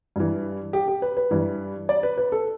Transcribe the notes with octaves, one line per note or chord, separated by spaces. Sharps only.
G2 E3
G4
G4
B4
B4
G2 E3
D5
B4
B4
A4